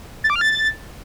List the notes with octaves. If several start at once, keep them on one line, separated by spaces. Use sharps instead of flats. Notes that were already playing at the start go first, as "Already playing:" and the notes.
A6
D6
F6
A6